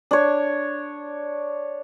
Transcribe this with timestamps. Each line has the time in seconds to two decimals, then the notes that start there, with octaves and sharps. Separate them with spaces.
0.11 D4 C#5